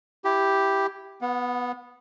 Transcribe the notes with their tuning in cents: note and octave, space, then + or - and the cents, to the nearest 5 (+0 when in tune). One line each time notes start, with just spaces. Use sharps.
E4 +0 G4 +0
B3 +0 F#5 -35